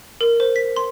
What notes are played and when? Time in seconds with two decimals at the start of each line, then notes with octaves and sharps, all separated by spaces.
0.21 A#4
0.40 C5
0.56 B6
0.76 C6